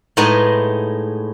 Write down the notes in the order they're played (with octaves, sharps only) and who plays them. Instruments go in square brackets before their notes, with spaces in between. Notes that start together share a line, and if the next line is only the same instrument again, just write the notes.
[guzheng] A2 G#3 B3 D#4 D#5